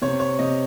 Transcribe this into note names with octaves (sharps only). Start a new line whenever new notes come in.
C3 C#5
C#5
C3 D#5